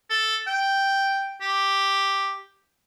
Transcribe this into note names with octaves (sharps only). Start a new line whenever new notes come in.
A4
G5
G4